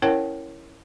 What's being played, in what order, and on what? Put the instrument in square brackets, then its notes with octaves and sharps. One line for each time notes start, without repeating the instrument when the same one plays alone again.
[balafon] C#4 E4 A#4 C#5 F#5 G5